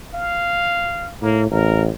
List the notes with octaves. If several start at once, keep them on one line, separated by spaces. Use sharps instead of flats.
F5
A2 A#3
A1 A#4